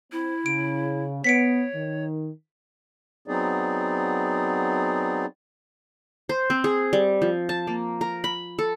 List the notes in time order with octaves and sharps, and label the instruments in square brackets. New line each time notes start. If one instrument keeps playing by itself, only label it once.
[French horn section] C4 [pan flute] E4
[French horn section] C#3 [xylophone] D7
[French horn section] B3 [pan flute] C#5 [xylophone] B6 C#7 D7
[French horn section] D#3
[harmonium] F#3 B3 C4 D#4 G#4 D5
[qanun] C5
C4
G#4
G3
F3
A5
A#3
A#4
B5
A4